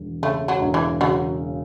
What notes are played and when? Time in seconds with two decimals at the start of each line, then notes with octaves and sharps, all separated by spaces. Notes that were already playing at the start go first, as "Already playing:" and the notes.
Already playing: E1
0.22 C#3 A3
0.48 F#3
0.61 E1
0.74 E3
1.01 C#3 F#3